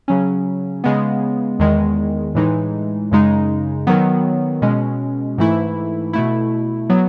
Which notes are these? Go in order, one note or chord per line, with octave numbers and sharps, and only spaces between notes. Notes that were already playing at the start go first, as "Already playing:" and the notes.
C#3 F#3 C#4
C#3 G#3 B3
E2 D#3 G#3
A2 E3 G#3 D#4
F#2 C#3 G#3 D#4
D#3 F#3 B3
B2 G#3 C#4
G#2 E3 A3 E4
B2 A3 E4
F#3 B3